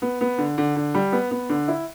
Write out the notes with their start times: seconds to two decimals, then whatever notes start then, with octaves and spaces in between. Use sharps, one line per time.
0.02 B3
0.21 B3
0.38 D3
0.58 D3
0.76 D3
0.94 G3
1.12 B3
1.31 B3
1.49 D3
1.68 E4